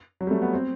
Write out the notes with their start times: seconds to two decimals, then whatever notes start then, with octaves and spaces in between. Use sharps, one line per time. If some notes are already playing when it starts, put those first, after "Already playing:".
0.21 F#3
0.27 G3
0.31 A3
0.42 B3
0.53 C4